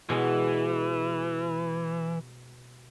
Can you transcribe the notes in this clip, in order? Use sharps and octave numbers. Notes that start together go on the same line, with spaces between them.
B2 E3 G#3